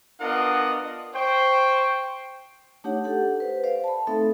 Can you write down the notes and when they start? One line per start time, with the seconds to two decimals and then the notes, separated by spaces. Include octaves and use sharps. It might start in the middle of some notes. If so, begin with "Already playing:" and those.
0.20 B3 D4 F4 A#4 D#5 F#5
1.14 C5 G5 C#6
2.84 A3 D4 D#4 G4 C#5 F#5
3.04 G4 A4 F#5
3.40 B4 C5
3.64 C5 D5 F5
3.84 A5 B5
4.07 A3 C4 D#4 A4 E5